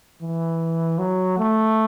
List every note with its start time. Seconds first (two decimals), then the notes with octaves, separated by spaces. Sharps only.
0.21 E3
0.99 F#3
1.38 A3